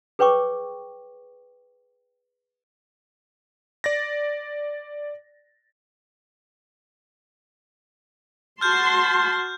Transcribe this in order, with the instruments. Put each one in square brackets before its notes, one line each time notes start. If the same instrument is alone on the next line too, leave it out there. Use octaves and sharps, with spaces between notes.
[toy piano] G#4 B4 C#5 G5 C#6 D6
[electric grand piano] D5 A6 A#6
[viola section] F#4 A5 C6 [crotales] F6 G6